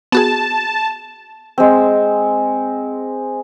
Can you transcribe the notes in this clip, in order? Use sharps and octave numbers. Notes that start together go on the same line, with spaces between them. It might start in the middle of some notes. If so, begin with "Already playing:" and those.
B3 F#4 G#4 A5
G#3 C4